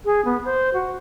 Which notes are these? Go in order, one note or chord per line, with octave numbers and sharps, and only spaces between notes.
G#4
B3
C5
F#4